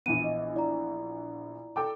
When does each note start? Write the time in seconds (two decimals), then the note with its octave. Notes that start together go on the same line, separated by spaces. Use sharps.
0.06 A#1 E3 B3 D#7
0.24 D#5
0.54 E4 D5 A#5
1.76 A4 G5 D6